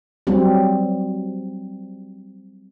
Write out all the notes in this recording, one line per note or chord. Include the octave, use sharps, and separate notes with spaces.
F#3 G3 C4